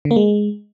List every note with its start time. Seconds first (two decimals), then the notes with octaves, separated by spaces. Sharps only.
0.05 D3
0.11 A#3
0.16 G#3